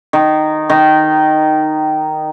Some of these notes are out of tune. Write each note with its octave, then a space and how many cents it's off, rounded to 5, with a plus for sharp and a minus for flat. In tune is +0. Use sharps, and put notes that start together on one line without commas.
D#3 -10
D#3 -5